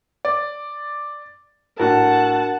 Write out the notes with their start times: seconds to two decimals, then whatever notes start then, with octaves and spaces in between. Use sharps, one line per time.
0.25 D5
1.80 A2 D4 F#4 A#4 F#5 A5